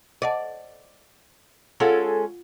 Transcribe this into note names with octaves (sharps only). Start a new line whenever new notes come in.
D5 D#5 F#5 A5
G#3 C#4 F4 A4 F5 F#5